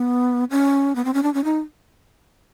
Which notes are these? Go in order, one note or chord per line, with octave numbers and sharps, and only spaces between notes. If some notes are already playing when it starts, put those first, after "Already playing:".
Already playing: B3
C#4
B3
C4
C#4
D4
C#4
D#4